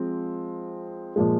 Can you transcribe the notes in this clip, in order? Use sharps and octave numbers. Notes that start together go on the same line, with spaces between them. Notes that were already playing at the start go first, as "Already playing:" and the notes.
Already playing: F3 G#3 C4
A#2 F3 G#3